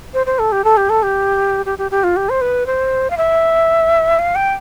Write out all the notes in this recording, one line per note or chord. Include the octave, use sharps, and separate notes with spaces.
C5
C5
A4
G4
A4
G4
A4
G4
G4
G4
G4
F4
G4
C5
B4
C5
F5
E5
F5
G5